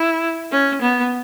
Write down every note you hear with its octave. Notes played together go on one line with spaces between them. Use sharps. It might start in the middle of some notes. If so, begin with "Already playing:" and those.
Already playing: E4
C#4
B3